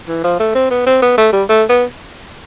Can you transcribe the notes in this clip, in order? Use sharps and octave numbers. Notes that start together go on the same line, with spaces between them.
E3
F3
A3
C4
B3
C4
B3
A3
G3
A3
B3